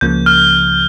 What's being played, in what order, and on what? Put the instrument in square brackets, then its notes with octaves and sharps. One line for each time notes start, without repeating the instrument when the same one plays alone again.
[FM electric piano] C#2 C#3 F3 A#3 [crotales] G6
[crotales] F6